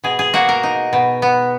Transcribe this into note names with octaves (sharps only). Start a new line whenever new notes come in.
B2 G#4
G#4
A#3 F#4
A#4
D#4
B2
B3